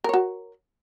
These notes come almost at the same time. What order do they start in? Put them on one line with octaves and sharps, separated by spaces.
A#4 C#5 F#4